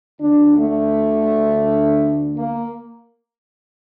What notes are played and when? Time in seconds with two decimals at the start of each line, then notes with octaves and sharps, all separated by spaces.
0.21 D2 D3 D4
0.57 A3
2.37 A#3